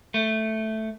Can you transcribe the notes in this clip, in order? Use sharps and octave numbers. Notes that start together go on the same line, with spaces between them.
A3